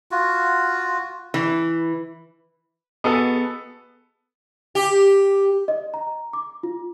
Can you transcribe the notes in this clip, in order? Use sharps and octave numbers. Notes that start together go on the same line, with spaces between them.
F4 F#4
E3
B3 F#4 G#4 A4 D#5
G4
D#5
A#5
D6
F4